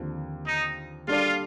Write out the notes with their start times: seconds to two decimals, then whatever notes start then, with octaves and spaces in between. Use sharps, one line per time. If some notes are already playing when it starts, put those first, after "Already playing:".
Already playing: D#2 D3 F3 C4
0.46 D#4
1.08 G3 D4 F4 A4 D5